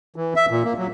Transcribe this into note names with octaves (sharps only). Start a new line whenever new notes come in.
E3
E5
A#2
A#3
F#3